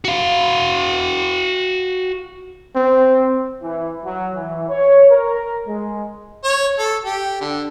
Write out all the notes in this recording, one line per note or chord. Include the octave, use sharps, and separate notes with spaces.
F#4 F5
C4
E3
F#3
E3
C#5
A#4
G#3
C#5
A4
G4
D3